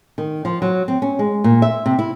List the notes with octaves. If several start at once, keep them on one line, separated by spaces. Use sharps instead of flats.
D#3
F3
F#3
C4
C#4
G#3
A#2
E5
C3
E4